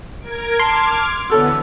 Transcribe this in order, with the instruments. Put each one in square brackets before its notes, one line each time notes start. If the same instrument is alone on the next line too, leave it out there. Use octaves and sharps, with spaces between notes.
[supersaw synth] A#4 G#6 D7
[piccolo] A5 [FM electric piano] C6 [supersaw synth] D6 F6 G#6
[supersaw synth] D3 E3 B3 [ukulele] F#4 A4 C#5 [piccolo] E6